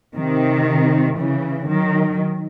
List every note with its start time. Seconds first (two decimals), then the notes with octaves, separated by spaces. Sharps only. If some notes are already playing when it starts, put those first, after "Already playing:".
0.16 C3 D#3
1.19 C#3 E3
1.70 D#3 F#3